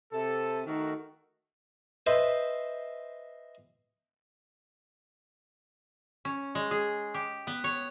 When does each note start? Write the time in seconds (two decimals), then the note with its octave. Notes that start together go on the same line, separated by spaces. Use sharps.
0.13 C3 A4
0.67 D#3 A3 D#4 F#4 A#4
2.06 B4 C5 D#5 E5
6.25 C#4
6.55 G#3
6.71 G#4
7.14 G4
7.47 B3
7.64 C#5